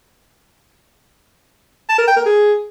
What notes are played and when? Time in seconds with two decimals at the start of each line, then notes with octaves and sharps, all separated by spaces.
1.89 A5
1.98 A#4
2.08 G5
2.17 A#4
2.26 G#4